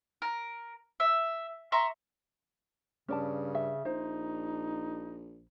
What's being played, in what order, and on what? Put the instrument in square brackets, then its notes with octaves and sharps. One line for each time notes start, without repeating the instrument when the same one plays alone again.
[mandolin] A#4
E5
E5 A#5 C6 C#6
[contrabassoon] G2 [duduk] C#3 [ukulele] C#4 D5 A5
[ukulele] E5
[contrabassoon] A#1 [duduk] D#4 [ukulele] C5